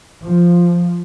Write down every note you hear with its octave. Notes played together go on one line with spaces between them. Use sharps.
F3